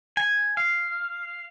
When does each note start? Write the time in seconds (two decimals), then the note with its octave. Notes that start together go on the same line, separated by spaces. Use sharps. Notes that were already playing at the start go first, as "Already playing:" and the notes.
0.17 G#5
0.57 F5